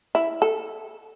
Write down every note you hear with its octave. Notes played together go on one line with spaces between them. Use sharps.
E4
A4